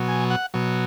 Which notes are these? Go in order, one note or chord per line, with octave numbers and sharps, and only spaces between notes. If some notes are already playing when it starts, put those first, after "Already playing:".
Already playing: B2 F#3
G#5
F#5
B2 F#3